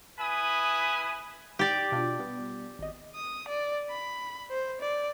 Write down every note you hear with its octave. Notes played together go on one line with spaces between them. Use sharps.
E4 B4 G#5 B5 D#6
G4 D5
B2 D4 F4
G3 B3
G#1 D#5
D#6
D5
B5
C5
D5